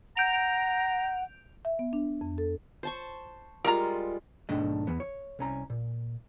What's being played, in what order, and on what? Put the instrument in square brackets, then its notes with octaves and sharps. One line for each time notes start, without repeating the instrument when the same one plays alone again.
[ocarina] F#5 [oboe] A#5 [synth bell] G6 D7 F7
[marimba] E5
B3
D4
F2
A4
[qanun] C5 A5 C#6
[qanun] G3 G#3 F4 [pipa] A#4 A#5
[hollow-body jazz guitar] B1 G#2 D#3 A3 D4 D#5
E2 E3 B3
C#5
C2 C#4 A#5
A#2